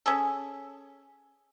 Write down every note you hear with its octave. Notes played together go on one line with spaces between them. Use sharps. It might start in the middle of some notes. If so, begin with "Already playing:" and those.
C#4 G#4 A4